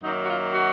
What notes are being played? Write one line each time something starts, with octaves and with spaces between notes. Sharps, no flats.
F#2 D#3 F#3 A#3 D#4
F#4
F4
F#4